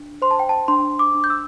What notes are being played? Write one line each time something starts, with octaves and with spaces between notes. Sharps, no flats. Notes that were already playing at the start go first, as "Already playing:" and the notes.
Already playing: D4
C5 C6
A5
G5
A5
D4 C6
D6
D4
G6
E6